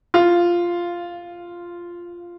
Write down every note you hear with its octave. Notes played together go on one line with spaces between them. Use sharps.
F4